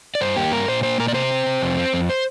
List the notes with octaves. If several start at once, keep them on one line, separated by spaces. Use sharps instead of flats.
D5
G2 C5
A#3 G4
G2 A#4
A#2 C5
A#3 C5
A#2 A#4
D5
C3 C5
C4
C3
F2
C4
F2
C5